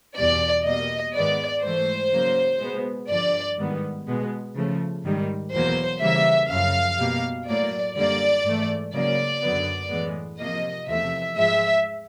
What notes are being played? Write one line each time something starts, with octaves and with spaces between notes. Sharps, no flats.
E2 B2 G3 D5
B2 G3 A#3 D#5
G#2 D#3 G#3 B3 D5
G#2 E3 A3 C5
C#3 F#3 A#3
B2 G#3 B3
G2 D3 F3 D5
G#2 D#3 G3 B3
B2 G#3 B3
C#3 F3 A3
G#2 D#3 G3
E2 B2 F#3 A#3 C5
C#3 E3 G3 A#3 E5
F#2 C#3 F3 F5
B2 G3 A#3
A2 F#3 A#3 D5
F#2 D3 G3 A#3 D5
G#2 E3 A3
C#3 F#3 A#3 D5
F#2 D3 F#3 B3
A2 E3 G#3 B3
C3 F3 A#3 D#5
E2 C3 F3 A3 E5
G#2 F3 G#3 E5